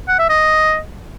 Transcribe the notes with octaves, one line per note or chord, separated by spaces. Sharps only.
F#5
E5
D#5